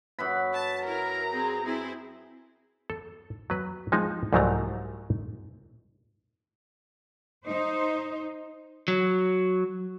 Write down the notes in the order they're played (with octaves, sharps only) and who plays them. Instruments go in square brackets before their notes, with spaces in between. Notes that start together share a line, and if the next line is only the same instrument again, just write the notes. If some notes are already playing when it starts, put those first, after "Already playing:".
[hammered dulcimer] F#2 B4 B5
[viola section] A5
[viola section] E4 A#4 [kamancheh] A#5
[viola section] C4 G#4
C4 E4 G#4
[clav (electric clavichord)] A4
F#3 B4
F3 G#3 D#4
C2 G#2 F3 F#3 A3 A#5
[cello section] D#4 C5
[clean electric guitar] F#3